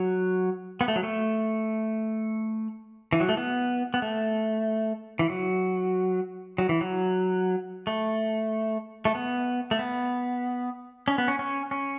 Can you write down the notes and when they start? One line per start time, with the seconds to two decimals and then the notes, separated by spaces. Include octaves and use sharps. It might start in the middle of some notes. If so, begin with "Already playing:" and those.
Already playing: F#3
0.81 B3
0.88 A3
0.96 F#3
1.03 A3
3.13 E3
3.20 F#3
3.29 A3
3.37 B3
3.94 B3
4.02 A3
5.19 E3
5.30 F#3
6.58 F#3
6.69 E3
6.81 F#3
7.87 A3
9.05 A3
9.15 B3
9.71 A3
9.79 B3
11.08 C#4
11.18 B3
11.28 C#4
11.39 C#4
11.71 C#4